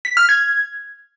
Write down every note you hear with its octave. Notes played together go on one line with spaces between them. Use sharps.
B6
F6
G#6